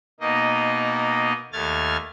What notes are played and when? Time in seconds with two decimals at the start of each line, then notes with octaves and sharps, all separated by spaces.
0.20 B2 A#3 D#4 D#5
1.53 D#2 A3 F6 G#6 A6